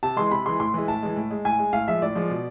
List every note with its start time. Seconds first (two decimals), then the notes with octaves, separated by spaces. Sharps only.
0.03 C3 A5
0.17 E3 G#3 C6
0.31 C3 B5
0.45 E3 G#3 C6
0.60 A2 C6
0.74 E3 G#3
0.88 A2 A5
1.03 E3 G#3
1.16 A2
1.31 G#3
1.45 A2 G#5
1.59 G#3
1.73 A2 F5
1.88 F3 G#3 E5
2.02 A2 D5
2.15 F3 G#3
2.30 B2